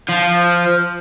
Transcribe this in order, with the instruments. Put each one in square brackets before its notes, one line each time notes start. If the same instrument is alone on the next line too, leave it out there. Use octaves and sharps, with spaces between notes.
[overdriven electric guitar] F3